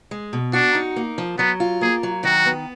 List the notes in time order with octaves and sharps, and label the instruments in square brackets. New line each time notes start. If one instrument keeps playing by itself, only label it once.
[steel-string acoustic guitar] G#3
B2
[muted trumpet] D4 [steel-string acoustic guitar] F#4
[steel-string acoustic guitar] D#4
A#3
F3
[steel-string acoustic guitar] F#3 [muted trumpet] B3
[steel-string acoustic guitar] F4
[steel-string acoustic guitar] A#3 [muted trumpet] G#4
[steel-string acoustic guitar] F#3
[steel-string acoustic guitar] D#3 [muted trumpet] F#4
[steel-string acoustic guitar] B3